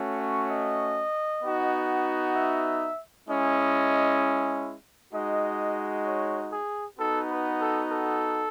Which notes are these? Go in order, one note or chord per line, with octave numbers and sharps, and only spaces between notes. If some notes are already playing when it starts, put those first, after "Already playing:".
Already playing: A3 C#4 F#4
C#5
D#5
B3 D#4 F#4
E5
G#3 C#4 E4 D#5
G#3 D#4 F#4 D#5
C#5
G#4
B3 D#4 F#4 A4
B4
A4
A4